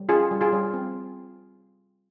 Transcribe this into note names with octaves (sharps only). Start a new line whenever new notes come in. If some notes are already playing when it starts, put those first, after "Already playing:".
Already playing: G3
C#4 F4 G#4
G3
F4 G#4
G3
C4